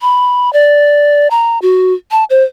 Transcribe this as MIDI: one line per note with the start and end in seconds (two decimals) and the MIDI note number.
0.01 0.52 83
0.53 1.28 74
1.31 1.58 82
1.62 1.93 66
2.11 2.24 81
2.30 2.43 72